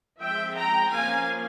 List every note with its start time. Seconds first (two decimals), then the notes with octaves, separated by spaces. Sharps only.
0.21 F3 G#3 C4 E5 G5
0.57 G5 A#5
0.93 F3 A#3 C#4 F5 G#5